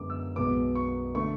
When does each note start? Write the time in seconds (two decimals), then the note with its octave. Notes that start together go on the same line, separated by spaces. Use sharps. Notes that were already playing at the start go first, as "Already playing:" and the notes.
Already playing: F#2 D3 G#3 B3 D6
0.10 E6
0.36 B1 B2 G#3 B3 D6
0.75 C#6
1.15 D3 A3 C#6